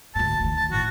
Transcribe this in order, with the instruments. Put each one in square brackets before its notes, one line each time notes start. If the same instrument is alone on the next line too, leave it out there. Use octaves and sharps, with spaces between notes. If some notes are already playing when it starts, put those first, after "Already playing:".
[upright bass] D2 G#2 [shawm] A5
[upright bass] D2 D#3
[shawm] A5
[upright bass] A2 D#3 [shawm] F#4